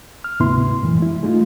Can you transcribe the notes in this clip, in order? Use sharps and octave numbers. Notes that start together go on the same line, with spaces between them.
F6
D2 G#2 C3 B3 E4 C6
F#2 A#2 E3
G#3 E4
G#3 A3 D#4 F4